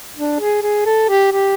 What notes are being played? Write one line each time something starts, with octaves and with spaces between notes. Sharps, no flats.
D4
G#4
G#4
A4
G4
G4